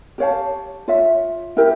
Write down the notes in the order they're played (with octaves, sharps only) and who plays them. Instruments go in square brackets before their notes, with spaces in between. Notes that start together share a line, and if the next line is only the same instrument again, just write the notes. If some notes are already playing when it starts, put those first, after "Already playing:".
[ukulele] G4 C#5 F5 A5
F4 C#5 E5
E4 G4 A#4